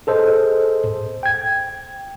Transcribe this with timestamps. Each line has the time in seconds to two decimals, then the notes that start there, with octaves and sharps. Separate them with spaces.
0.07 G#4 A4 C5 D#5
1.23 G5 G#6